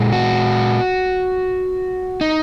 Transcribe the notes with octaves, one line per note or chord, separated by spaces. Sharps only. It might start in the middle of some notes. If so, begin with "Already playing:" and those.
Already playing: A#2 G#3
F#4
D#4